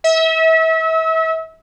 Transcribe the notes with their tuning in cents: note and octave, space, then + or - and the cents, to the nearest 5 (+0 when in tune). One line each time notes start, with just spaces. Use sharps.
E5 -35